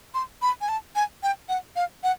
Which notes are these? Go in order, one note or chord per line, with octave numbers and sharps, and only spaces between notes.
C6
B5
G#5
A5
G#5
G5
F#5
F5
F#5